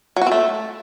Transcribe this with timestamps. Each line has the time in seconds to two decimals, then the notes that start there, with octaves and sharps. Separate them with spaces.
0.16 F#3
0.21 F#4
0.27 C4
0.32 A3